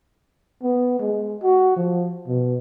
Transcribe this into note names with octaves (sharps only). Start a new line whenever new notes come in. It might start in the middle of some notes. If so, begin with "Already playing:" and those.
B3
G#3
F#4
F3
B2